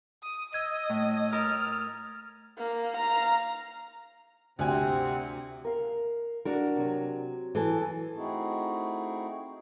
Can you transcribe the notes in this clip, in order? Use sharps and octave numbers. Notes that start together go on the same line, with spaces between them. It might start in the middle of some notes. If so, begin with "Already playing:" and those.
D#6
D#5 E6 G#6 D#7
A2
A#4 D#6 F6 A6
A#3
F5 A#5
D2 C3 C4 F#5 G#5
A#4 F5
D4 F#4 A#4
C3 F#3
E3 G#4 A4
A3 C4 D#4 E4 F#4 G#4